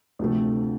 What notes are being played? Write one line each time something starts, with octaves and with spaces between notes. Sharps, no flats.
D2 C3 F3 A3